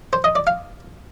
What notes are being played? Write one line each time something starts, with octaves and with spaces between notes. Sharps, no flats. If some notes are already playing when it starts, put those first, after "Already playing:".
C5
D#5
D5
F5